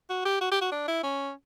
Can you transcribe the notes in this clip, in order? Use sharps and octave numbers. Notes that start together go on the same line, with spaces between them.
F#4
G4
F#4
G4
F#4
D4
E4
C#4